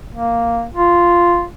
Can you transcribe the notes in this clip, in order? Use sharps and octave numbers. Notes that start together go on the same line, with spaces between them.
A#3
F4